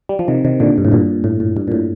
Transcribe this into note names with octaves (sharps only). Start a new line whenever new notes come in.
G3
F3
C3 D#3
C3 D#3
A#2 D3
G2
A2
G2 A#2
A2
A2
G2
A#2
A2